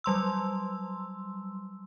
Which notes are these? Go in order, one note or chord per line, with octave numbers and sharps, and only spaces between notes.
F#3 G3 C6 E6